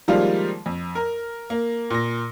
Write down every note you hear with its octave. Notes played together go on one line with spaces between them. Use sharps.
D#3 F3 G3 G#3 A#3 F4
F2
A#4
A#3
A#2 A#6